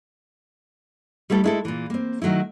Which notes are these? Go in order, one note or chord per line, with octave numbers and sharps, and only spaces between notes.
G3 A3 E4 G#4 A4
G#3 E4 A4
A#2 E3
A#3 C4
D#3 F#3 A3 E4